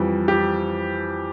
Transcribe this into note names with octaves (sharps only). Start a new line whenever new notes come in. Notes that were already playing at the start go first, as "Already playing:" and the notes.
Already playing: F2 E3 G3
G4